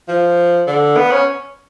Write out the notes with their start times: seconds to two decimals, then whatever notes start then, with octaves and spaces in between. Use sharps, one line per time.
0.08 F3
0.67 D3
0.96 B3
1.11 C#4